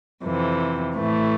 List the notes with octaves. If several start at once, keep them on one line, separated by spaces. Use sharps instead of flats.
F2 C3 E3
A2 E3 A3